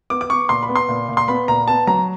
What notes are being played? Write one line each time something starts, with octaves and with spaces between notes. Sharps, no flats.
B3 D6
D6
B3 C#6
A#2 C6
B5
B3
C6
A#2
A#2
C6
B3 B5
A#2 A#5
B3 A5
F#3 A#5